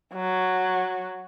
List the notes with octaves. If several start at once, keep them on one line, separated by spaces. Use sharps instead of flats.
F#3